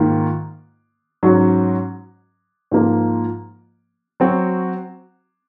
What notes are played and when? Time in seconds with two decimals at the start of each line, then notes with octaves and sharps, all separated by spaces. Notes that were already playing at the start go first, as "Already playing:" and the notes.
Already playing: G#2 D#3 A#3 F4
1.23 G#2 F#3 C#4 F#4
2.71 G#2 F3 A#3
4.20 F#3 C4 F#4